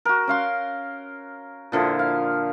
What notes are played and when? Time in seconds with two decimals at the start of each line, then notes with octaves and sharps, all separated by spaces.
0.05 F#4 A#4
0.27 C#4 F5 C6
1.72 A#2 D3 F3 E4
1.99 F5